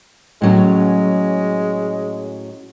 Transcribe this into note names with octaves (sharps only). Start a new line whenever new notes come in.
A2 F#3 G#3 C#4